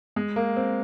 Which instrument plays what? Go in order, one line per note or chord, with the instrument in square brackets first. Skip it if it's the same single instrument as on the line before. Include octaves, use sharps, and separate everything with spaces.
[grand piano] G#3
A#3
C4